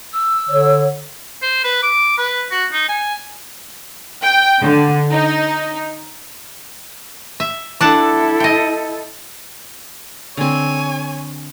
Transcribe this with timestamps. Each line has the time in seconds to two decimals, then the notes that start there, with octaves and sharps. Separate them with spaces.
0.13 E6
0.50 D3 C#5
1.42 C5
1.64 B4
1.83 D6
2.18 B4
2.51 F#4
2.72 D#4
2.89 G#5
4.22 G5
4.60 D3
5.10 D#4
7.40 E5
7.81 D4 E4 A4 F#5 A5
8.40 D#5 G5
10.37 D3 C4 C#5 G#5